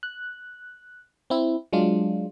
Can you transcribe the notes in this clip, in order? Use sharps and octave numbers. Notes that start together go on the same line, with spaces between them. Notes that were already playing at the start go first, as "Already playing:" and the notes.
F#6
C4 E4
F#3 G#3 D4 F4